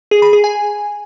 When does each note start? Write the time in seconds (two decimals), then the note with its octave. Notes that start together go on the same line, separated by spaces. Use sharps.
0.11 G#4
0.22 B5
0.33 G#4
0.44 G#5